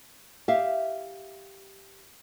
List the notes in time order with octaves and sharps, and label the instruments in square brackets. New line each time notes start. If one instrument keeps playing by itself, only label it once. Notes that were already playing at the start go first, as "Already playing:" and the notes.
[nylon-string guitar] G4 E5 F5